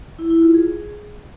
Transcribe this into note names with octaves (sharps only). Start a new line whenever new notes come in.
E4
E4
F4
G#4